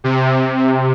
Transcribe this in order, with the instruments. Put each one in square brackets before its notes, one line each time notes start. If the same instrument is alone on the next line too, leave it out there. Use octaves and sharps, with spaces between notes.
[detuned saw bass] C3